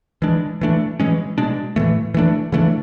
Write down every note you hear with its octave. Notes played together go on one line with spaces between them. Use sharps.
E3 G#3 D4
E3 A3 D4
E3 G#3 C#4
B2 G#3 D4
A2 E3 A3
E3 A3 D4
C#3 E3 A3 D4